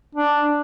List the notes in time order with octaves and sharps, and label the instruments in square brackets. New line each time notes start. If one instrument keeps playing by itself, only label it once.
[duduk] D4